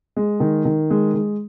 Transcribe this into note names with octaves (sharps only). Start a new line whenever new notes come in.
G#3
D#3
D#3
G#3
G#3